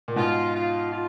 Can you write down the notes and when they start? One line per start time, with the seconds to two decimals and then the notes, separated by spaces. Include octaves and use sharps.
0.08 A#2
0.16 G#2 B2 F4
0.54 F4
0.92 F4